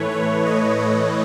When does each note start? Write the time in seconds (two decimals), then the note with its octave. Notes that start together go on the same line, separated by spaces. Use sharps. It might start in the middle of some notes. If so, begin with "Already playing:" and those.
Already playing: A2 E3 A3 B4 C#5
0.12 C#5
0.46 D#5
0.80 C#5